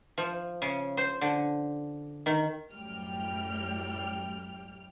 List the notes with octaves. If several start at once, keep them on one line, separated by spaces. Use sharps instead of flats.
F3
C#3
C5
D3
D#3
F#2 A2 G3 G5 F6